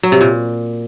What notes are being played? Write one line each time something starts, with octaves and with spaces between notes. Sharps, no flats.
F#3
C3
A#2